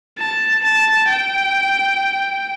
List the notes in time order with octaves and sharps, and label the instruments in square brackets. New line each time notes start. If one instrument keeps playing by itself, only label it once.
[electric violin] A5
A5
G5